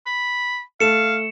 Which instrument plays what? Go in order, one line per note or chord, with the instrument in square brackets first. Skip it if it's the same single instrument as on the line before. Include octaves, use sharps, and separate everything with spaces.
[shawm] B5
[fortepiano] A3 [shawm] F5 [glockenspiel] C#7 E7